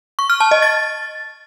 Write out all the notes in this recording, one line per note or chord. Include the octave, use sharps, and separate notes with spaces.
C#6
F6
A5
D#5
A6